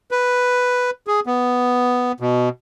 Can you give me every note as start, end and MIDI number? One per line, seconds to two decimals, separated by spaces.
0.11 0.90 71
1.07 1.20 68
1.26 2.12 59
2.20 2.49 47